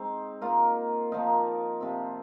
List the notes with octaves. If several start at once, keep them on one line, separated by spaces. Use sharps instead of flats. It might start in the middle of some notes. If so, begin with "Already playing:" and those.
Already playing: G#3 C4 D#4 C5
A#3 F4 A#4
F3 A#3 D#4 A#4
C3 F3 C4